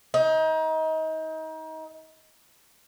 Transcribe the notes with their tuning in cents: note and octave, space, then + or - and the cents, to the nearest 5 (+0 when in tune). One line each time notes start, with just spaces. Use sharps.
D#4 +30